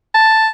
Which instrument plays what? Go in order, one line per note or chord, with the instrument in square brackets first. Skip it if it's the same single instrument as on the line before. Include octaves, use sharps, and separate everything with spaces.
[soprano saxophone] A5